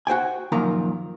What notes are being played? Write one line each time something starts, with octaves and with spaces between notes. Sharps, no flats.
F#4 C5 G5 G#5
F#2 A#2 D#3 F3 A#4 A#5